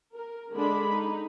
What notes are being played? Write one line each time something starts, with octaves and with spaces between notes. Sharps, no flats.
A#4
D3 G#3 D4 B5
D#4